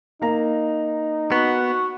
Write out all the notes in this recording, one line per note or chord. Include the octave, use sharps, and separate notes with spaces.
A#3 D#4 A#5
B3 F#4